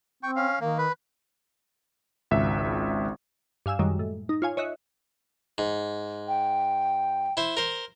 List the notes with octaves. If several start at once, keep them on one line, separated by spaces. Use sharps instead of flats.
C4 G5 C#6
C#4 F5
D#3 A#3
B4
G#1 C#2 E5
G2 F5 G#5 E6 E7
F#2 D#3 G3 G#3
A2
D#4
F4 C#5 F5 G#5
C#5 D#5 E5 F#6 C#7
G#2
G5
E4 C5
A#4 C5